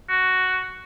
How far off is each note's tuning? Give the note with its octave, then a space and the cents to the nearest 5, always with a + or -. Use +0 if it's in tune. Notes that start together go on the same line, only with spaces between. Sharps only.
F#4 +5